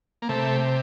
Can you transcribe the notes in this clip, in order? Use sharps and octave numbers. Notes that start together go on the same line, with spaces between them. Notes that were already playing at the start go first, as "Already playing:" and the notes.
A#3
C3 A3